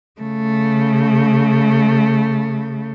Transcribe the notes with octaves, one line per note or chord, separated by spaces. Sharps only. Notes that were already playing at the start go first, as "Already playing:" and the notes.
C#3 A3